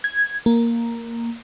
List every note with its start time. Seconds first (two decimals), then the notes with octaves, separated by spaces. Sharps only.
0.04 G#6
0.46 A#3